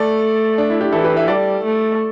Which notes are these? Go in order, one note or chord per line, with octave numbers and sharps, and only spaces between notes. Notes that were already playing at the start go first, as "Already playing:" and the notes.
Already playing: A3 A4 D5
D4
E4
D4 G4
E3 E4 A4
G4 B4
B4 E5
G3 A4 D5
A3